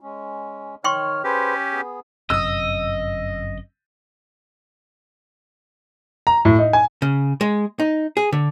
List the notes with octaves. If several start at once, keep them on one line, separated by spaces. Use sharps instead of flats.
G#3 C#4
D#3 C#5 G5 C6 C#6 F6
C#4 G4 G#4 B4 C5
B3 G#4
G1 F#2 C3 D#5 D#6 E6
A#5
A2
D#4
G#5
C#3
G#3
D#4
G#4
D3